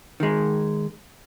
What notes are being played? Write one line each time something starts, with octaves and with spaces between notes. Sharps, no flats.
D#3 G#3